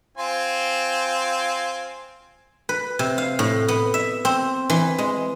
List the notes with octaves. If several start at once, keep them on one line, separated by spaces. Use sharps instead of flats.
C4 F4 G#5
B4
C3
F5
A2
B3
E5
C4
E3
G#3